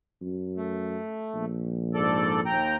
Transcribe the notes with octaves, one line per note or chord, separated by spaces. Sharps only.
F#2
A3
A#1
G#2 A4 D5
D#2 G5 A#5